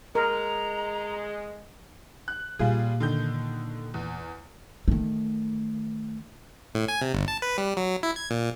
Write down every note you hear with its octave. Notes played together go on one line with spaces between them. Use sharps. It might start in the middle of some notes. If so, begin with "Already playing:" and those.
G#3 A#4 A#5
F#6
A#2 G3 F4 G#4
D3 D#3 G6
E2
D#3 A3
A2
G#5
C3
G1
A5
B4
G3
F#3
E4
G#6
A#2